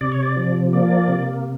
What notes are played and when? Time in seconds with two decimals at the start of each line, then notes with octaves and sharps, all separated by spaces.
0.01 C3 D5
0.12 C#5
0.23 D5
0.37 F3
0.72 A#3 D5
1.08 C3